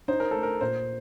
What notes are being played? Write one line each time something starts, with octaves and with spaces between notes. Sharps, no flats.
D#4 C5
A#4
A3 A4
A#4
A#2 C5